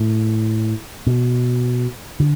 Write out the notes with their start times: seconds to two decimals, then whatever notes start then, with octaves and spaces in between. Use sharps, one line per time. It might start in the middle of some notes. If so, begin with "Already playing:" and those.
Already playing: A2
1.07 B2
2.20 D3